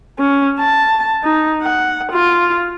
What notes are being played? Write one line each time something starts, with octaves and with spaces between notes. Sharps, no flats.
C#4
A5
D#4
F#5
F4